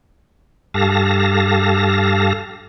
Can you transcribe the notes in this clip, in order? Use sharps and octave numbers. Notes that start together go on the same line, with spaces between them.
G2 G4 A4 F5 A5 A#6